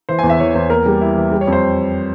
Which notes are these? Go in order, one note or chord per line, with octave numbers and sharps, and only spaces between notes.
E3 C5
E2 G#5
E5
E3 C#5
E2 C5
A#3 A#4
G3
E4
E3
G3
C#5
F2
C5